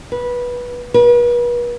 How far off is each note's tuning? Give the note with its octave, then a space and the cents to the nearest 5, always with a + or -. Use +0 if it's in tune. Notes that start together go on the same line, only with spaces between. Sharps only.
B4 -15
B4 -40